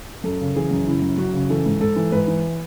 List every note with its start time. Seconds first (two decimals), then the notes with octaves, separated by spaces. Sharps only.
0.24 F#2 A4
0.41 C#3
0.56 E3 G#4
0.71 F#2
0.87 C#3 E4
1.02 F#2
1.18 F#2 F#4
1.33 C#3
1.50 E3 A4
1.66 G#2
1.81 G#2 A4
1.96 E3
2.12 G#2 B4
2.27 E3